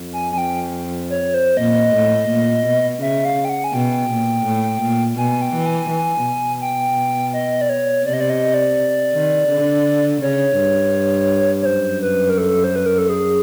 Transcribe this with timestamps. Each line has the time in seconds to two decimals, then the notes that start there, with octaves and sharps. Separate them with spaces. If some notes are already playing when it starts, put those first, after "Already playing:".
Already playing: F2
0.13 G#5
0.32 G#5
0.38 G5
1.10 C#5
1.34 C5
1.57 A#2 D#5
1.94 A2
2.29 A#2
2.66 B2
3.01 C#3 E5
3.25 F5
3.45 G5
3.49 F#5
3.64 G#5
3.73 B2 G5
4.10 A#2
4.45 A2
4.82 A#2
5.17 B2 G#5
5.42 G5
5.54 E3
5.66 G#5
5.89 E3
6.26 B2
6.61 G5
7.33 D#5
7.61 D5
7.69 C#5
8.06 C3 D5
8.13 D#5
8.20 D5
8.30 D#5
8.54 D5
9.13 D#3
9.49 D3
10.22 C#3 C#5
10.58 G2
11.62 C#5
11.65 F#2 C5
12.02 B4
12.30 A#4
12.38 A4
12.64 C5
12.76 B4
12.86 A#4
12.98 A4
13.09 G#4